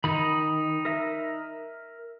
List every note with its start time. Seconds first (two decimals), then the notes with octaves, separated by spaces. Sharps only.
0.04 D#3 D#4 B5
0.85 A#4 E5